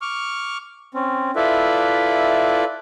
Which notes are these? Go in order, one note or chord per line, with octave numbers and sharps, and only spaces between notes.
C#6 D6 F6
C4 C#4
E4 F4 A4 B4 D5 E5